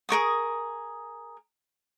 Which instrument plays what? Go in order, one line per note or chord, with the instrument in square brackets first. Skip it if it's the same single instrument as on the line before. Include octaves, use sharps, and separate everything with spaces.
[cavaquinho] G#4 A#4 C#6 D#6